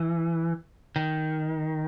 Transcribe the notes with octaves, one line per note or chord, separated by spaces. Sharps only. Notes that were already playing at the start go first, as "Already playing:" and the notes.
Already playing: E3
D#3